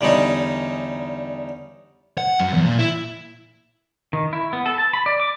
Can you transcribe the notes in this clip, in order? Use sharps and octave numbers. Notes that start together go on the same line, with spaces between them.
E2 D3 G3 C#4 D#4
F#5
F#2
E2
A#2
E4
D#3
E4
B3
A4
A5
B5
D5
D6